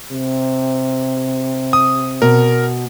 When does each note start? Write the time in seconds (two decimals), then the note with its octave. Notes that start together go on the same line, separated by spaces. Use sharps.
0.12 C3
1.73 D#6
2.22 B2 A#4